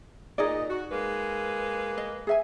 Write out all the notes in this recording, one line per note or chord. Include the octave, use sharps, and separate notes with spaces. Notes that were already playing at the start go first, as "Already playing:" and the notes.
A#2 D#4 G#4 D5 D#5
F#4
G#3 A#3 B4
D#5
G#4 E5 G#5